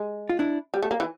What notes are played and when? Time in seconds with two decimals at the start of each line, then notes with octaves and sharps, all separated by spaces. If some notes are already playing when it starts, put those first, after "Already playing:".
Already playing: G#3
0.29 F4
0.39 D4 E4
0.74 G3
0.83 A3
0.91 A#3
1.00 E3